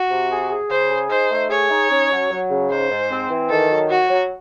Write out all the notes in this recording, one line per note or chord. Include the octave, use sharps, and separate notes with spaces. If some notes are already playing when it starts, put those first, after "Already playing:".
Already playing: F#4
C3
G#4
G#4
C#3 C5
G#4
D#4 C5
A3
G#4 C#5
D#4
C#4
F#3
F#3
C#3
G#2 C5
G#2
C4
E3
D#3 A4
F#3
F#3 F#4
F#3